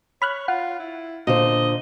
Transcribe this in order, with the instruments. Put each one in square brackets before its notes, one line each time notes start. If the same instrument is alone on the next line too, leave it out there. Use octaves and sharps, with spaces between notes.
[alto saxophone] C#5 [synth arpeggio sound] B5 F6 F#6
[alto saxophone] F4 [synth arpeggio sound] F#5
[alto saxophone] E4
[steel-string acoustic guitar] A#2 D3 C5 [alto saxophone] D#5